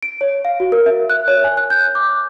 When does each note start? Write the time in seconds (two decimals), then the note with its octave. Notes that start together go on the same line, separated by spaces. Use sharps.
0.03 D7
0.21 C#5
0.45 F5
0.60 F#4
0.72 A#4
0.86 E5
1.10 F#6
1.28 C#5
1.44 G#5
1.57 F#6
1.70 G6
1.95 D6